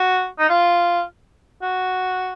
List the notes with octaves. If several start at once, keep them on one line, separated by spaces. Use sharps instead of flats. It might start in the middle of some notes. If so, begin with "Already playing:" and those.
Already playing: F#4
D#4
F4
F#4